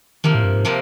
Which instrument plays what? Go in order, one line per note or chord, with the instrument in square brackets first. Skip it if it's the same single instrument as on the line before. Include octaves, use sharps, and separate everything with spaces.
[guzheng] C3 F3 A#3 [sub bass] D#3
[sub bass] A2
G2
G#2
[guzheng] C3 F3 A#3